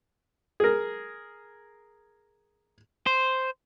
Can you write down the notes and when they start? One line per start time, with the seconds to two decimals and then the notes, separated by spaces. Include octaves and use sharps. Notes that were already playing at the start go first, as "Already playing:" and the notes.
0.60 G#4 A#4
3.06 C5